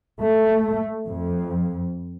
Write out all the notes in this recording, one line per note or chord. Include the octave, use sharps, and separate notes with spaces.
A3
F2